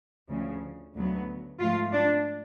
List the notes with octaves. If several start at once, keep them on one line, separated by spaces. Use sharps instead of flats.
D2 C#3 F3
D2 C#3 F#3 B3
G#2 F3 A3 F4
D4